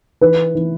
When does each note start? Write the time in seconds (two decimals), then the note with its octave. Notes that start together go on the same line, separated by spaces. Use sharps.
0.21 E3 B4
0.55 E3